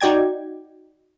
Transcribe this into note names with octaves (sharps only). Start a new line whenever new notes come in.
D#4 F#4 D5 G5 G#6